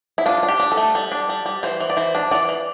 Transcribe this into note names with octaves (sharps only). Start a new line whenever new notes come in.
E4
D4 F4
D4
G4
D4
A4
A3
G3
D4
G3
G3
E3 C5
E3
D5
E3 C5
D4
E3 D5
E3